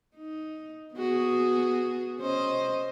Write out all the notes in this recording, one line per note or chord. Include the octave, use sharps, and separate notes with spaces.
D#4
B3 F#4 G#4
C#4 C5 D#5